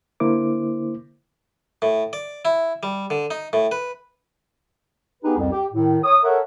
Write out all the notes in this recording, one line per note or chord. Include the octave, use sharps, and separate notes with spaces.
D3 A#3 E4 C5 D6
A2
D5
E4
G3
D3
D#4
A2
B4
B3 D#4 G4 G#4 B4
C2 F2
G4
A2 D#3
C#5 D#6
A4 A#4 C#5 E5 F#5